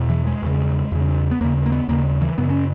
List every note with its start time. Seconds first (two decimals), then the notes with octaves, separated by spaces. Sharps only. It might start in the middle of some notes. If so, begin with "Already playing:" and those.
Already playing: E2 B2
0.10 E3
0.27 G#3
0.42 E2 C#3
0.92 E2 C#3
1.31 B3
1.41 D#2 C#3 A#3
1.66 A#3
1.72 B3
1.88 D#2 C#3 A#3
2.21 E3
2.38 F#2 C#3 B3
2.50 C#4